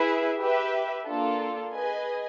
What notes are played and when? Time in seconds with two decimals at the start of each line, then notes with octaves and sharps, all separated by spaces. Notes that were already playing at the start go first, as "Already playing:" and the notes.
Already playing: E4 G#4 B4 E5
0.39 G4 B4 E5
1.06 A#3 D4 F4 A4
1.74 G#4 B4 D#5 G#5